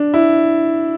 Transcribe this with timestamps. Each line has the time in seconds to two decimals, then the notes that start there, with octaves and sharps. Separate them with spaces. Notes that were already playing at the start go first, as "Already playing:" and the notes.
Already playing: D4
0.14 E4